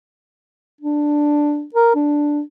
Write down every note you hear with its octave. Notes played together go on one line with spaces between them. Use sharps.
D4
A#4
D4